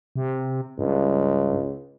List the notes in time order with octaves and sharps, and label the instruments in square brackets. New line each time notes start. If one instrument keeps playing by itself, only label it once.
[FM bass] C3
[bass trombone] C#2 [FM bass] G2